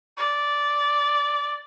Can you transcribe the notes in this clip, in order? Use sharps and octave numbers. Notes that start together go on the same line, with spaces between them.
D5